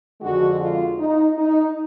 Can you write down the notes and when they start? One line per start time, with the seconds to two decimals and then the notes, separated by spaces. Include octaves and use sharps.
0.21 F2 D3 G#3 F#4
0.60 F4
0.99 D#4
1.37 D#4